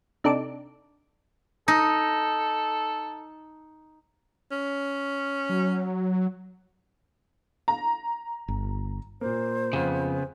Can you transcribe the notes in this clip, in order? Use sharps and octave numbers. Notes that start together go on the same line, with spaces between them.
C3 D4 D#4 A4 D6
D#4 A4
C#4
F#3
A#5
G1
A#2 A#3 C5
F2 C#3 B3